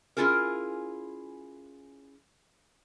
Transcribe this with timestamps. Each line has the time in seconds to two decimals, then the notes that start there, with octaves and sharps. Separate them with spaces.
0.17 C#4 E4 F4 G#4 A#4